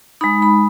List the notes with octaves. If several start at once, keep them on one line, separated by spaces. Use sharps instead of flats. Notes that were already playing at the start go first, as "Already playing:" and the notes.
G#3 D#4 B5
B5